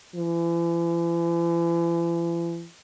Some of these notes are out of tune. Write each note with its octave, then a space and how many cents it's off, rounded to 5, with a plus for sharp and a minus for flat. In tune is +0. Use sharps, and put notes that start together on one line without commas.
E3 +45